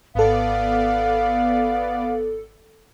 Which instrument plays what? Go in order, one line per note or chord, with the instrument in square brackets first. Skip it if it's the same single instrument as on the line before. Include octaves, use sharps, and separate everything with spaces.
[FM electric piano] G#1 A4 [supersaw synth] B3 D5 [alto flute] F5